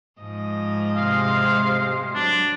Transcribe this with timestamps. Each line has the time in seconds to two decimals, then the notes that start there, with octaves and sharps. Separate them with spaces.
0.20 G#2 F3 D#5
0.96 C3 G#3 C5 F5
2.15 F#3 D4